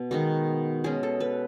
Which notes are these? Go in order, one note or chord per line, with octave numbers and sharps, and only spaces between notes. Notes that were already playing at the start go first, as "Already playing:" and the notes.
Already playing: B2
D#3 G#3 B3 F#4
B2 G#3 C#4 G#4
A4
B4